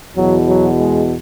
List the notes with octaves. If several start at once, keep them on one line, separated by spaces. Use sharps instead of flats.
E2 B2 F#3
F#3
G#3